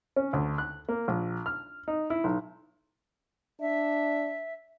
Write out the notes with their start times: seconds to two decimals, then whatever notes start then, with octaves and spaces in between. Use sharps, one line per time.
0.16 C#4
0.33 D2
0.58 F#6
0.89 A#3
1.08 A#1
1.46 F6
1.88 D#4
2.10 E4
2.24 B1
3.61 D4 E5